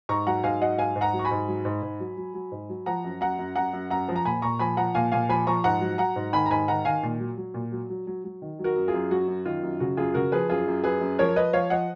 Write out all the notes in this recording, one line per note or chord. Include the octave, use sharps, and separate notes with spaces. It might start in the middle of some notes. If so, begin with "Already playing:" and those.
G#2 A#5 C#6
F#3 F#5 A#5
G#2 F5 G#5
F#3 D#5 F#5
G#2 F5 G#5
G#2
F#5 A#5
F#3
C#6
G#5 B5
G#2
F#3
G#2
G#2
F#3
F#3
F#3
G#2
F#3
F3 F#5 A#5
F#2
F#2 F#5 A#5
F#2
F#2 F#5 A#5
F#2
F#2 F#5 A#5
F3
A#5
A#2 G#5 B5
A#2 A#5 C#6
F3 G#5 B5
F3 F#5 A#5
A#2 F5 G#5
A#2 F5 G#5
F3 G#5 B5
F3 A#5 C#6
G#2 F#5 A#5
F#3
F#3 F#5 A#5
G#2
D#3 G#5 B5
A#5
G#2 G#5 B5
D#3 F#5 A#5
D#3 F5 G#5
A#2
F#3
F#3
A#2
F#3
F#3
F#3
F#3
D#3
F#3
F#4 A#4
F#2
F4 G#4
F#2
F#3 F#4
F#2
D#3 F4
F#2
C#3 F#4
F#2 F4 G#4
C#3 F#4 A#4
F3 G#4 B4
F#2 F4 G#4
F#2
F#2 G#4 B4
F#2
F3 A#4 C#5
F3 B4 D#5
F3 C#5 F5
F3 D#5 F#5